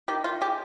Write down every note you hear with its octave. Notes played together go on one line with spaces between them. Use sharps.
D#3 G4
D#3 F4
G#3 G4